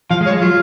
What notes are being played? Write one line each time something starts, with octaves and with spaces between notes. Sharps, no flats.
F3 F5
G#3
C#5
G#3
F#3 F4